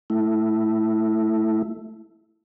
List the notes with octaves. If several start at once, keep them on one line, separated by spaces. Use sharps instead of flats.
A3 E4